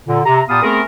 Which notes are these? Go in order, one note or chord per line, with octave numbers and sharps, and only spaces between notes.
A#2 D3
C3 A#5
A#2 B3 G4 F5 A5 D#6
A3 B3 C4 G#4 A#4